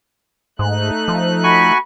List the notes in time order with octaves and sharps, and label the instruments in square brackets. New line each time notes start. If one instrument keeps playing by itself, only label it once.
[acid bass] G#2 [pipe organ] A3 D#4 F#6
[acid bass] F3
[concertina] F#4 G#5 C#6 [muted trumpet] B5